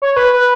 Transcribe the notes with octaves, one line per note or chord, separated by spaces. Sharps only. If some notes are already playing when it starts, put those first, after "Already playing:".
C#5
B4
B4